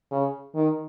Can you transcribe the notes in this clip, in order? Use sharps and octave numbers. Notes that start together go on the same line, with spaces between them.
C#3
D#3